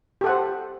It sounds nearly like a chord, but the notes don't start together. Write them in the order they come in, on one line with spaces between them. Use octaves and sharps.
G4 A4 F#5 C5